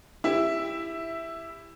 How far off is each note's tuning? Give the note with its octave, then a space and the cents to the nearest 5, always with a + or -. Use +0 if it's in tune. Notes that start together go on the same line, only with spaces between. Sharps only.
E4 +10 G4 +25 E5 +0